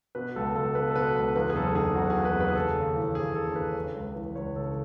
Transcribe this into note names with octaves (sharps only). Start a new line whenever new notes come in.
B2 B4
C#2 A4
C#2 A4
B2 B4
A4
B2 B4
C#2 B4
E2 B4
G#4
F#1 A4
D#3 G#4
F#1 F#4
G#4
E2
B4
F#1 B4
G#4
C#3 A4
D#2
E3
D#2 G#4
C#3 A4
D#2 B4
C#3
C#2
E3
C#2 C#5
C#3 A4